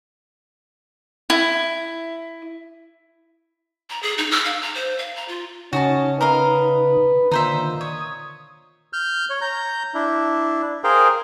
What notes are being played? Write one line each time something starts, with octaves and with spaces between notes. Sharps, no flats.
E4
A#5
G#4
D#4
E6
F5
A#5
C5
F5
A#5
F4
C#3 C#4 D#4 F#4 D#5 A5
A#4 B4 D#5 F5
A#2 D3 D#3 D#4 C5 E5
C#5 D#6
F6 G6
C#5
A#5 G6
D4 E4
G#4 A#4 C5 F5 G5